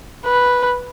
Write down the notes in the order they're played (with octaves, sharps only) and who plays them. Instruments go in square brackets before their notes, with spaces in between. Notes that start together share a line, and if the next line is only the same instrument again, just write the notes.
[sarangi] B4